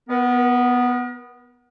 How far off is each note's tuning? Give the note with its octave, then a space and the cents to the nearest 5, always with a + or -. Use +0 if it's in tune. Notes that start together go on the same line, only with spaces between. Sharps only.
B3 +0 A#4 +45